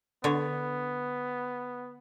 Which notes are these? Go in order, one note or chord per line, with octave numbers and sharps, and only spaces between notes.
D3 B3 C#5